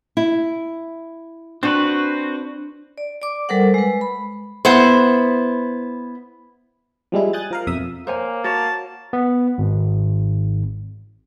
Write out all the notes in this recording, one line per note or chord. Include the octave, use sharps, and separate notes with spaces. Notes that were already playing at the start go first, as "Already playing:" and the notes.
E4
C4 D4 F#4 B4
D5
D5 D6
G3 A4 A#4 C5 F#5
G#3 B4
B5
B3 E4 C5
F3 G3 G#3 E4
G#5 D#6 F#6 G6 A6
F3 A#4 F5
B1 F2 E5 D#6
A#3 C5 C#5 G#5
F#4 C#5 A5
B3
G#1